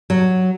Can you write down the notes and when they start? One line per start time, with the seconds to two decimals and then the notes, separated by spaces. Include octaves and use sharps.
0.10 F#3